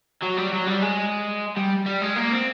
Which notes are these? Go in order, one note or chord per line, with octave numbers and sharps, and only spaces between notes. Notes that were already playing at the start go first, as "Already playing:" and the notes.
F#3
G3
F#3
G3
G#3
G3
G3
G#3
A#3
C4